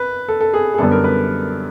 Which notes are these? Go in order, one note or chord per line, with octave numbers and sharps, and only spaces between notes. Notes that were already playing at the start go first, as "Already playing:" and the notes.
Already playing: B4
A4
A4
G#4
G#4
F#2 D3 G3 B3 D4 A4
A#4
B4